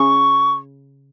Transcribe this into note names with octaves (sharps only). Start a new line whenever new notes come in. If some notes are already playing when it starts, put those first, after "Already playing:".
Already playing: C#3 C#6